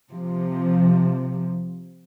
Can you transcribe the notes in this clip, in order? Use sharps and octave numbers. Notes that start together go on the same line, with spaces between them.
C3 F3